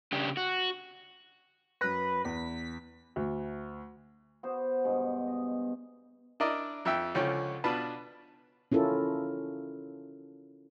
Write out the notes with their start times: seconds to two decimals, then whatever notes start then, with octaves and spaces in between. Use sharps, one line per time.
0.12 C#3 D4 G4
0.37 F#4
1.81 F#2 B4 A#6
2.25 E2 B6
3.16 D2
4.43 B3 F#4 C5
4.84 G2 B2 G#3
5.28 D#5
6.40 D4 E4 A#4 D5 D#5
6.85 F2 E5 G5 E6
7.15 C#2 D3 F3 C#4 G5 C#6
7.64 B2 D4 F4 B4 A5 B5
8.72 C#4 E4 F4 A4 A#4